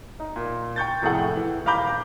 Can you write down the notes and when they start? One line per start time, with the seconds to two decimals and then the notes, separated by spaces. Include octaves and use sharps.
0.20 D#4
0.36 A#2
0.76 G5 C#6 G6 A6
1.02 F1 A2 G#4 A4 F#5 G5
1.37 E3
1.66 D#1 F5 A#5 B5 D6 G6